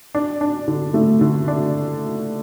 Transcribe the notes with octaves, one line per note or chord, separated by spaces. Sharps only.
D4
D4
D3
A3
D3
D4